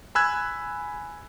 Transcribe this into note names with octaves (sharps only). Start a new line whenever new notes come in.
G#5 B5 E6 F#6 G#6